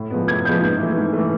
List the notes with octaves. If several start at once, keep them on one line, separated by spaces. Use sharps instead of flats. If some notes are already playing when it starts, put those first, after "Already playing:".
Already playing: A2
F3 G#3 B3
A2 G#6
F3 G#3 B3 G6
G#2
E3 A3
G#2
E3 A3